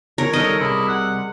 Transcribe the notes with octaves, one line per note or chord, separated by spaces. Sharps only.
A#4 C#5
D#3 G3 A4 D#5
C2 C3 E4 G#4
F#5